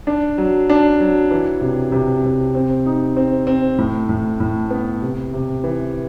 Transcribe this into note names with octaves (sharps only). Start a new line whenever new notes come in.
D4
F#3
D4
F#3
E3
C3
C3
C3
C4
D#4
C4
C4
A2
A2
A2
B3
C3
C3
E3